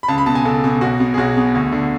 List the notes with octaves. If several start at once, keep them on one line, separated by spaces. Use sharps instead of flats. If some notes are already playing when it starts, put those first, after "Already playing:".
B5
C#2 A5
B5
B2 A5
G#5
C#2 A4
B2
B1 F#4
B2
G#4
B1 F#4
B2
D2
D3